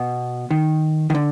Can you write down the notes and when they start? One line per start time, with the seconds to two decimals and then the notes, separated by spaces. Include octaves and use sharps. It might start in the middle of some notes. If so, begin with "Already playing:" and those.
Already playing: B2
0.51 D#3
1.10 D#3
1.15 D3